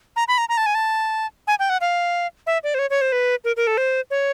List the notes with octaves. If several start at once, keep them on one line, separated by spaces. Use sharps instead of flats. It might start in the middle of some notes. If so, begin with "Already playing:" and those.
A#5
B5
A#5
A#5
A5
G#5
A5
G#5
G5
F#5
F5
E5
D5
C5
C#5
C#5
C5
B4
A#4
A#4
A4
C5
C#5